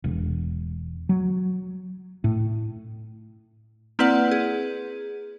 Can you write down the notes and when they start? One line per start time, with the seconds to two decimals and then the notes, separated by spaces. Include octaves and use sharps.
0.04 E1
1.09 F#3
2.24 A2
3.99 A#3 C4 E4 B4 D5 F#5
4.31 G#4